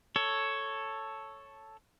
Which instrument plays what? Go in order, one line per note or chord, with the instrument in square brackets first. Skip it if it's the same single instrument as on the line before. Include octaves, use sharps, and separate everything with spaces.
[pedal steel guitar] A4 C#5